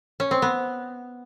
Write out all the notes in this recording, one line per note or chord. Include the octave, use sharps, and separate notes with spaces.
C#4
C4
B3